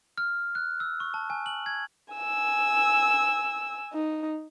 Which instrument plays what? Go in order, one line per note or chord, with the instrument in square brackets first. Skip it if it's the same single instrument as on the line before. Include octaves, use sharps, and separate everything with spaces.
[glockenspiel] F6
F#6
E6
C#6
A5
G#5
F#7
G#6
[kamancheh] G#5 E6
D#4